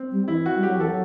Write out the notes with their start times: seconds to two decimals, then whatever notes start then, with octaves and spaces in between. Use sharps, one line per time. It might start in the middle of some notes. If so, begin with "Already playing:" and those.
Already playing: C4
0.11 G3
0.28 E3 E4
0.46 F#4
0.54 G3
0.63 F#3 G4
0.77 E3 A4
0.89 F#3